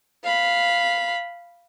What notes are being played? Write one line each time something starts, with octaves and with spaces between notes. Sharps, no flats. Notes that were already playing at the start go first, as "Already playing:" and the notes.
F5 B5